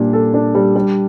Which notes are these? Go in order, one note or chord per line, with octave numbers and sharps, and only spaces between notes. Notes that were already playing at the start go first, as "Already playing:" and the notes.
Already playing: A#2 G3 D4
A4
D4
G3
G3